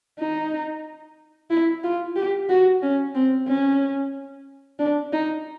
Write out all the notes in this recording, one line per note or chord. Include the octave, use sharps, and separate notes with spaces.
D#4
E4
F4
G4
F#4
C#4
C4
C#4
D4
D#4